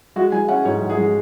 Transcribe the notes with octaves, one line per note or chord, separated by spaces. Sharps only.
G#3 F#4
G#3 G#5
C#4 F#5
G#2 C#5
G#2
G#4
G#3